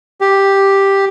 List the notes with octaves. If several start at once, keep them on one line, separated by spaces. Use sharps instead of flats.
G4